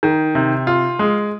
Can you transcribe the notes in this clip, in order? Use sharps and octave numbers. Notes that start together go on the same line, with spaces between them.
D#3
C3
F4
G#3